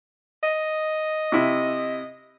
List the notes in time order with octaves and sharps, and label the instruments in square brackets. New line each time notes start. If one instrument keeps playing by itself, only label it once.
[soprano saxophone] D#5
[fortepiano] C3 E4